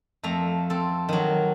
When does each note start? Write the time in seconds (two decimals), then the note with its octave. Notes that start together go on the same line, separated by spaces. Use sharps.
0.23 F2 A3 A#5
0.70 C4 A4
1.09 D#3 F#3